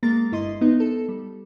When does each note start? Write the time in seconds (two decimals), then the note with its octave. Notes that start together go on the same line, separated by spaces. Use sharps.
0.03 G#3 A#3 A#5 A6
0.32 G1 E4 D#5 C6
0.61 B3 D#4
0.80 A4
1.08 G3